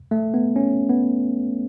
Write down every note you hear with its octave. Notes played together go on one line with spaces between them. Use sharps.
A3
B3
C#4
B3